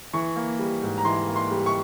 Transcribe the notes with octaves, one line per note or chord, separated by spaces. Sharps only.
E3 C#6
A#3
G3
G#2
A#5
E3 C6
A#3
C6
G3
C#6